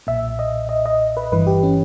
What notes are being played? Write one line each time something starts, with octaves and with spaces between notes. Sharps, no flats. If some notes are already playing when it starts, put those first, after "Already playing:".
B1 A#2 E5
D#5
D#5
D#5
B4
G1 G2 E3 B4
G4
C#4